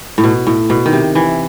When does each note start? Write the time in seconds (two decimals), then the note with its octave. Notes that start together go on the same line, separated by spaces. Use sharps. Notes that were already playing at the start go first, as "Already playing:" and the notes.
0.18 A2
0.24 B2
0.47 A2
0.70 B2
0.86 D#3
0.93 C3
1.15 E3